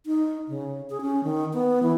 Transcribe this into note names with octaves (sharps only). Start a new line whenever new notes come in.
D#4
C#3
G#4
C#4
D#3
B3
E3